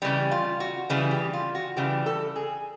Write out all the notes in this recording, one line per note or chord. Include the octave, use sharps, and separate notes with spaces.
C#3 E3 G3 G4
F4
F#4
C#3 E3 G3 G#4
G4
F4
F#4
C#3 E3 G3 G4
A4
G#4